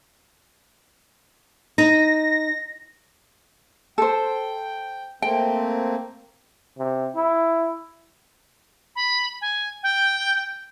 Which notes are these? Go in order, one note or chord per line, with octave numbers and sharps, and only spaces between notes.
D#4 A#6
A4 C5 G5
A3 A#3 C4 G5
C3
E4
B5
G#5
G5